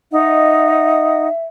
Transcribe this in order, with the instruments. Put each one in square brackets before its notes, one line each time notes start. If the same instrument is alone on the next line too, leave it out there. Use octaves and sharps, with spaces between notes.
[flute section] D#4 D#5 F#5 [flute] E5